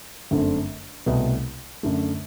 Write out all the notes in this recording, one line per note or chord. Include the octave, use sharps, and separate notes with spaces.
G1 F#2 D3 A3 C4
C2 B2 A3
F#2 D3 A3